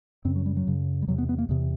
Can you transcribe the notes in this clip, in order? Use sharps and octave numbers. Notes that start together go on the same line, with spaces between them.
F#2 C#3 C4
F#3
G3
F#3
F#2 C#3
G3
E2 C3 F#3
B3
B3
A#3
E2 C3 B3